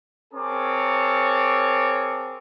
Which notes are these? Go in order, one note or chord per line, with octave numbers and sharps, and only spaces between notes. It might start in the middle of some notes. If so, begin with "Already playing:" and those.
C4 G#4 A#4 C#5 A5 D6